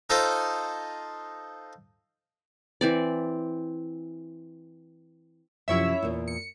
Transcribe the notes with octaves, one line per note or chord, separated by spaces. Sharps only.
D#4 F4 A4 C5 D#5
E3 C4 D5
F#2 C3 F3 E4 C#5 E5
E2 A#2
C#7